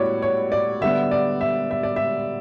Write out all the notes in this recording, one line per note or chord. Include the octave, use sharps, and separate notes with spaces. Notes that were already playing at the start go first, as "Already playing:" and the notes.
Already playing: A2 G3 B3 E4 F#4 C#5 D5
C#5
D5
D3 G3 B3 E5
D5
E5
E5
D5
E5